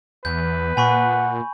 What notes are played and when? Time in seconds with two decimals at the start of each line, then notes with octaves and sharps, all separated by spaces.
0.25 E2 B4 G6
0.77 A#2 F#5 G#5 B5 C#6